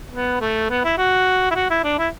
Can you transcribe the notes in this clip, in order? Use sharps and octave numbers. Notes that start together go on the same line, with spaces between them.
B3
A3
B3
E4
F#4
E4
F#4
E4
D4
E4